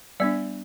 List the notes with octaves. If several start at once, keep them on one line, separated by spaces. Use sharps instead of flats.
G3 B3 D4 D5